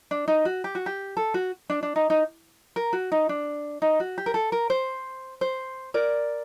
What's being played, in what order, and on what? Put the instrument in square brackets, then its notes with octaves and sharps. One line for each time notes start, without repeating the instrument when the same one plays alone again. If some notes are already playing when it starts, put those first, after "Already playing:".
[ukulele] D4
D#4
F#4
G4
F#4
G4
A4
F#4
D4
D4
D#4
D#4
A#4
F#4
D#4
D4
D#4
F#4
G4
A#4
A4
A#4
C5
C5
A#4 D5